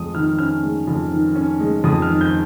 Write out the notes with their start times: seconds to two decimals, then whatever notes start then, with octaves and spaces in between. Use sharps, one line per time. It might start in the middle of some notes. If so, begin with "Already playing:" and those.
Already playing: F2 G#3 D#6
0.14 D#3 F6
0.38 C#4 F6
0.63 G#3
0.87 F2
1.12 D#3
1.36 C#4
1.60 G#3
1.84 F2 D#6
2.02 F6
2.09 D#3
2.21 G6